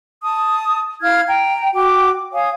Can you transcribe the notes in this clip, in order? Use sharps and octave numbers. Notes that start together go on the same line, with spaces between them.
A5 D#6
E4 F5 F6 G#6
G5 A#5
F#4 G5 D6
C#5 F5 G#5 D#6